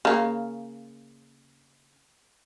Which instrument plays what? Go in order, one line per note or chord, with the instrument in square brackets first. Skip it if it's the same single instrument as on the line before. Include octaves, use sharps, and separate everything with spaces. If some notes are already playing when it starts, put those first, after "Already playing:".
[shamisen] C#3 A#3